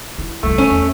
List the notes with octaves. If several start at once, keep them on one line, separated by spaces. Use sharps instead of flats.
E4
C2 F#2 A3
F#3 C#4
E2